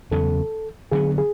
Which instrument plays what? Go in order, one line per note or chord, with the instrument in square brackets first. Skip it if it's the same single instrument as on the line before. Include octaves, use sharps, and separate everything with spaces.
[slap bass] E2 C#3 F#3 B3 [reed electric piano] A4
[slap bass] D3 F#3 B3 [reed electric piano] G#4
[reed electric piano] G#4